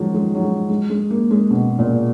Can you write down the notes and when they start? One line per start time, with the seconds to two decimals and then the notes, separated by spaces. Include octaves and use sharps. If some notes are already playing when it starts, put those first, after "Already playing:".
Already playing: D#3 F3 F#3 G#3
0.14 G#3
0.35 F#3
0.42 G#3
0.69 G#3
0.90 G#3
1.10 A#3
1.31 G#3
1.51 B2
1.79 A#2